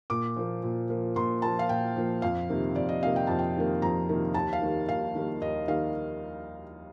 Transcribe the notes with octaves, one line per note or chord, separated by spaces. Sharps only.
A#2 D6
F3 A#3
A#2
F3 A#3
A#2 C6
F3 A#3 A5
F5
A#2 G5
F3 A#3
F2 F5
C3 D#3 A#3
F2 D5
D#5
C3 D#3 A#3 F5
G5
F2 A5
G5
C3 D#3 A#3
F2 A#5
C3 D#3 A#3
D#2 A5
F5
D#3 G3 A#3
D#2 F5
D#3 G3 A#3
D#2 D#5
D#3 G3 A#3 F5